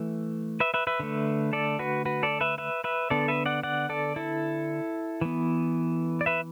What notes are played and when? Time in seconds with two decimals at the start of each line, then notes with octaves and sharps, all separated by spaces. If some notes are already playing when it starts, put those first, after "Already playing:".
Already playing: E3 A3
0.60 B4 E5
0.74 B4 E5
0.87 B4 E5
1.00 D3 A3
1.53 A4 D5
1.79 F#4 B4
2.05 F#4 B4
2.23 A4 D5
2.41 B4 E5
2.58 B4 E5
2.84 B4 E5
3.10 D3 B3 A4 D5
3.28 B4 E5
3.46 D5 F#5
3.63 D5 F#5
3.89 A4 D5
4.16 E4 A4
5.21 E3 B3
6.21 D5
6.26 B4 E5